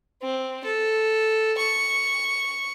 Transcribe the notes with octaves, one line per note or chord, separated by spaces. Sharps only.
C4
A4
C#6